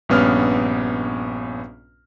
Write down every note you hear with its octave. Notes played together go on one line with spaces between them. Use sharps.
A#1 G2 B3 C#4 F6